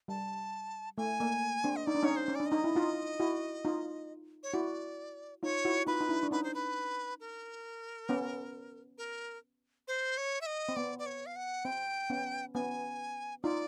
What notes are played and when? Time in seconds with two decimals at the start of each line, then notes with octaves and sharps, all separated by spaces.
0.08 G3 A5
0.97 A3 G#5
1.20 A#3
1.64 C4 D4
1.76 D#5
1.86 D#4 D5
1.95 D4
2.03 C#4 D#4 C#5
2.16 C5
2.28 C#4
2.35 D4 D5
2.46 D#5
2.52 D#4
2.64 E4
2.76 D#4 F4
3.20 E4 F#4
3.65 D#4 F4
4.43 C#5
4.54 E4 F#4 D5
5.43 D#4 F4 C#5
5.65 E4 F#4
5.87 D#4 F4 B4
6.01 D#4
6.09 D4 E4
6.23 D4
6.31 C#4 D#4 B4
6.44 C5
6.54 B4
7.20 A#4
8.09 B3 C#4
8.98 A#4
9.88 C5
10.17 C#5
10.41 E5
10.46 D#5
10.69 C4
10.76 B3 D5
10.99 D5
11.06 C#5
11.26 F5
11.36 F#5
11.65 C4 G5
12.10 B3 C#4
12.55 B3 C#4 G#5
13.43 D#4 F4 D5